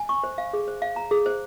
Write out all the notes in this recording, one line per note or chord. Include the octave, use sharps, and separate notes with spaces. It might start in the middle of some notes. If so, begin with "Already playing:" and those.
Already playing: G#5
C#6
C5
F5
G#4
C5
F5
A#5
G#4
C5